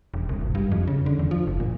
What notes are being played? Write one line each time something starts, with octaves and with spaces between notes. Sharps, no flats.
E1
C2
G#1
G2
F2
C#3
D3
E2
F3
F#1
A#2